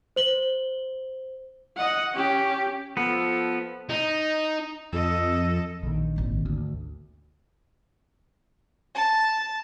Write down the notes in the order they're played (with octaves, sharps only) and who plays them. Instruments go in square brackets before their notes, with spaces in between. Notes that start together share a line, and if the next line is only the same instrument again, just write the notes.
[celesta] C5 F#7 G7
[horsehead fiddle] D#5 F#5
C#4 G4
[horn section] F3 A4 [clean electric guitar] B3
[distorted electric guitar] D#4
[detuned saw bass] F2 [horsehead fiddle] A4 D#5
[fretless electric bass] A#1 D#3
[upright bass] G#1 A#2
[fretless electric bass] D2
[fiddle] A5